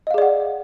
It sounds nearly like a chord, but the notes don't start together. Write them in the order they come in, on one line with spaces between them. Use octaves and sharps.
D#5 F5 G#4 D5 F#5